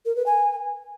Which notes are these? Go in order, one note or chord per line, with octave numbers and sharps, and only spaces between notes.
A#4
B4
G#5